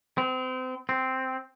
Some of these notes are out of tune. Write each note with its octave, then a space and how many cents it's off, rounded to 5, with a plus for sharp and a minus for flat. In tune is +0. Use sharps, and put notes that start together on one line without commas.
C4 -30
C4 -5